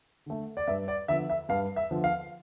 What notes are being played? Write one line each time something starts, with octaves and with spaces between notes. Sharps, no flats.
D3 A3
D5
G2 E5
D5
D3 F3 B3 E5
E5
G2 F5
E5
D3 F3 B3
F5